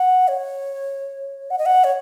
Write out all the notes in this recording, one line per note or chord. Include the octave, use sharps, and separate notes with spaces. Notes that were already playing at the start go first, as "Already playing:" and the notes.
Already playing: F#5
C#5
F#5
D#5
F#5
C#5